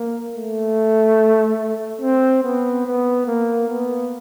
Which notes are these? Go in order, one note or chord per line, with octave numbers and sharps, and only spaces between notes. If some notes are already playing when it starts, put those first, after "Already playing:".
Already playing: A#3
A3
C4
B3
B3
A#3
B3